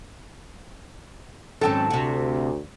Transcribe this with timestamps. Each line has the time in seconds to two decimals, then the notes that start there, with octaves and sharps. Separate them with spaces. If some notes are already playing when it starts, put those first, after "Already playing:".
1.61 G#2 D#3 F#3 C4 C#4 A4 G5 A5
1.90 D2 C3 F#4